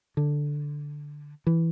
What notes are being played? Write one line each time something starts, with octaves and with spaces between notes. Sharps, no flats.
D3
E3